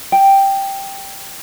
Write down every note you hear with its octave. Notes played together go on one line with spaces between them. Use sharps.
G5